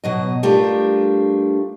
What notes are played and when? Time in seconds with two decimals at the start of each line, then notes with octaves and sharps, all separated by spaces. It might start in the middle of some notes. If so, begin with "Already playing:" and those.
0.04 B2 F#3 D#5
0.43 G3 A3 D4 F4 G4 A#4